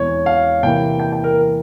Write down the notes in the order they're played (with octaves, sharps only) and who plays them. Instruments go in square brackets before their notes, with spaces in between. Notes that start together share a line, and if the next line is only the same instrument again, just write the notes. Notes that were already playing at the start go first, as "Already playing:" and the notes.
Already playing: [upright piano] E1 E2 E3 C4 [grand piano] C#5
[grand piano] F5
[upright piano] C3 E3 A#3 [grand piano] G5
[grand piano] G5
G5
A#4